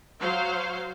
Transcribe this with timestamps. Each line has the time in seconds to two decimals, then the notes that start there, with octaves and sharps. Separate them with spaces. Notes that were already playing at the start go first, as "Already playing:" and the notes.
0.21 F#3 C5 F5